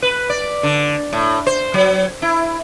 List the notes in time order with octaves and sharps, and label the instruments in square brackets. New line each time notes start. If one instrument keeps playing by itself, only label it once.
[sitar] B4
D5
D3
A2
C5
F#3
E4